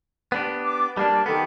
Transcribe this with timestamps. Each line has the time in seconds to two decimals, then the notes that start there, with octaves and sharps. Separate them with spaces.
0.32 B3 D4 G4
0.63 D6
0.97 G3 A#3 D4 D5 A5
1.26 D#3 B3 G4 A4